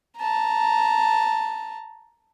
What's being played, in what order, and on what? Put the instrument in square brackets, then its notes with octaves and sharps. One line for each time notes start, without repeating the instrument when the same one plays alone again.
[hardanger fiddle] A5 A#5